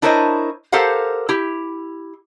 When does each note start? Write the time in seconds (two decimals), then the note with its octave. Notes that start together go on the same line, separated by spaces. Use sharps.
0.02 D4 E4 A#4 C5 C#5 D#5
0.72 G4 A4 A#4 C5 F5 F#5
1.29 E4 G4